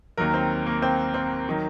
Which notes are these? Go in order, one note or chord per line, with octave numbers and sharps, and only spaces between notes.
D#2 D#3 F#3 A#4
C4
A#3
C4
C4
D#3 F#3